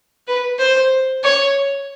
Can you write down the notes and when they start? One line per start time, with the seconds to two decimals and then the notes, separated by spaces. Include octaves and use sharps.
0.27 B4
0.59 C5
1.23 C#5